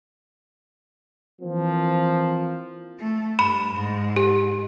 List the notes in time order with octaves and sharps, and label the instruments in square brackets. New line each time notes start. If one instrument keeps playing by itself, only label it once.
[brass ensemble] E3 F3 A#3 C4
[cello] A3
[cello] G2 [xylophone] B5
[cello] G#2
[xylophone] G4